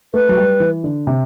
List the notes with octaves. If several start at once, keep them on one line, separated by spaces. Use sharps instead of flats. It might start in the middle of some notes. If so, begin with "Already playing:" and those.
A3 B4
F#3
G3
E3
D3
C3